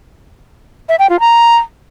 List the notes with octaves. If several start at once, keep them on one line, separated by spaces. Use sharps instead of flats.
E5
G5
F4
A#5